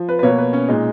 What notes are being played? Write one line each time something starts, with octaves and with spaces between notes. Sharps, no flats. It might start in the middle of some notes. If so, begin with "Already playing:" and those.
Already playing: F3
B4
B4
B2 A#3 C#5
B4
C#4
A#2 G#3 D#4